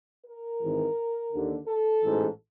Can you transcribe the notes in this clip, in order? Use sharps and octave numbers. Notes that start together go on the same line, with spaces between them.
A#4
G#1 G#2 E3
D#2 D3
A4
A1 G#2 E3